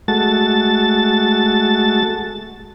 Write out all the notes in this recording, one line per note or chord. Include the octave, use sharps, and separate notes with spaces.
G#3 A3 F#4 A5 A6